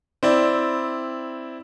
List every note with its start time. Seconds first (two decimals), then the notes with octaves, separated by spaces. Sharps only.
0.23 C4 E4 D5